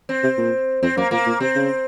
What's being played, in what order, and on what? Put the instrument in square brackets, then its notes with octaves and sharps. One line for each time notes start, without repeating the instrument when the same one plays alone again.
[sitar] C4
[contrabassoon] C3
A#2
[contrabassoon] F2 [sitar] C4
[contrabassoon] F#2 [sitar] A#3
[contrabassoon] A#2 [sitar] A#3
[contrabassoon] A#2
[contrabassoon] C3 [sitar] C4
[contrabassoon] C#3